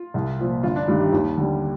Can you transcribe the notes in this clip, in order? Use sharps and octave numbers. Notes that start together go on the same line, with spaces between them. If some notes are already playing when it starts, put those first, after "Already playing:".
Already playing: F4
C2
A#2 F3
G1 F4
D4
G2 D#3 G3 F4
G4
D#2 F4
D3 G3